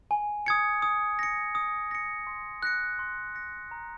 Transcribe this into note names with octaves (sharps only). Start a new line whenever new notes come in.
G#5
D#6 G#6 C#7
D#6
A#6 C#7
D#6
A#6 C#7
C6
F#6 A#6 C#7
C6
F#6 A#6 C#7
A#5